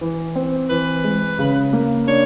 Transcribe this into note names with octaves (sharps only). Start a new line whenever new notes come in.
E3
C4
E3 B4
G#3
C#3
A#3
D4 C#5